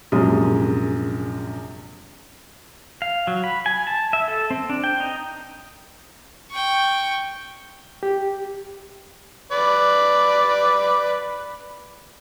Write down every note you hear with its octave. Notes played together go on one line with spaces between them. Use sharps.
A#1 F#2 C3 G#3 D#6
F5
F#3
B5
G#5
A5
E5
A4
C4
D4
G5
D#4
G5 C#6
G4
B4 D5